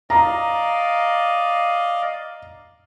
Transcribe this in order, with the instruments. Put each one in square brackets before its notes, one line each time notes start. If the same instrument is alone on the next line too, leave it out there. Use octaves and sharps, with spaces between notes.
[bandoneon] D5 D#5 F5 [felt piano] A#5